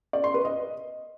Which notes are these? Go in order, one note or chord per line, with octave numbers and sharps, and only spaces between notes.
D5
C6
B4
D#5